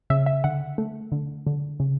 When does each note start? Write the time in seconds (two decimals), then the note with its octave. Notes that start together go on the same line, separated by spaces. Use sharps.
0.10 C#3 E5
0.26 E5
0.44 D3 F#5
0.78 A3
1.12 D3
1.47 D3
1.80 C#3